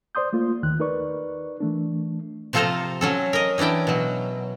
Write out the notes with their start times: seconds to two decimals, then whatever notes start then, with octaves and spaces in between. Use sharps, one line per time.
0.15 C5 D5 C6 D#6 G6
0.33 A3 A#3 F4
0.63 D#2 D#3 F#6
0.80 D#4 A#4 B4 D5 C#6
1.60 E3 A3 D4
2.53 C3 F3 F4 A4 C5 A#5
3.01 F#3 C#4 A4
3.33 A#4 D#5
3.58 E3 C#4 D4 E4 G5
3.87 B2 F#3